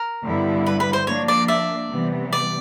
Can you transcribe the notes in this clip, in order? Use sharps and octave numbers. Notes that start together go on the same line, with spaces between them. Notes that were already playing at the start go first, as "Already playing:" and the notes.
Already playing: A#4
G2 D3 G3 B3 E4
B4
B4
C5
F3 A#3 D4 C#5
D5
D5 E5
C3 E3 G3 B3
D5